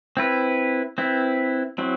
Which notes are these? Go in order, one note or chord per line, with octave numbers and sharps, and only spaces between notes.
C4 E4 B4
C4 E4 B4
F#3 C4 E4